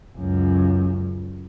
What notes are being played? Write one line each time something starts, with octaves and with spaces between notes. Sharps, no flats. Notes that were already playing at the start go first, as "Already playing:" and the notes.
C#2 F#2